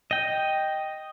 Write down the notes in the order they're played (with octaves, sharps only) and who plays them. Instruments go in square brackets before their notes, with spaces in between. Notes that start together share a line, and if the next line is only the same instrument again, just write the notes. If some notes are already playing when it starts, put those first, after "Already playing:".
[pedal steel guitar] D#5 G5